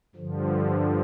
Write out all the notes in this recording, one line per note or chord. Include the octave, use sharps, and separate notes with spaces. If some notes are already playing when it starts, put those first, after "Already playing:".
G2 D3 F3